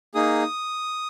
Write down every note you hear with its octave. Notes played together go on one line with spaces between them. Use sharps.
A#3 D#4 G#4 D#6